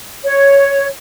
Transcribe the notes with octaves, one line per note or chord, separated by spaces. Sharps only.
C#5